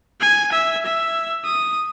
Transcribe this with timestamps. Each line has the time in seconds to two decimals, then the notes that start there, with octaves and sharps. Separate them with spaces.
0.21 G#5
0.52 E5
0.86 E5
1.45 D#6